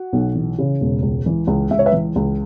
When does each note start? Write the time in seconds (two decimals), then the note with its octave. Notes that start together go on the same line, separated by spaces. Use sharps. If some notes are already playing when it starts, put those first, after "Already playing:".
Already playing: F#4
0.13 B1
0.35 E3
0.58 C#3
0.81 E1
1.02 C#2
1.26 E3
1.47 C#2
1.71 C#2 E5
1.79 C#5
1.86 B4 E5
1.92 E3
2.16 C#2